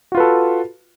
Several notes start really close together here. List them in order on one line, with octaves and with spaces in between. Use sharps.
F#4 F4 B4 A4